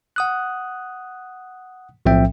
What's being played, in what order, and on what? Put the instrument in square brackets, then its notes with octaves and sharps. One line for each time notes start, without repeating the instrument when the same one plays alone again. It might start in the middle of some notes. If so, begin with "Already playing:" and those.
[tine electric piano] F#5 D#6 F#6
B1 A2 F3 C4 E5 G5